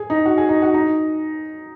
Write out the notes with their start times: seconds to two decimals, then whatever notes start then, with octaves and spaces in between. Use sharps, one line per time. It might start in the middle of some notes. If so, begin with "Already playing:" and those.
Already playing: G#4
0.10 D#4
0.26 F#4
0.38 G#4
0.49 D#4
0.62 F#4
0.74 D#4